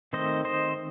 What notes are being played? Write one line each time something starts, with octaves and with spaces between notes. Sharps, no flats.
D#3 A3 C4 C5 D#5
C5 D#5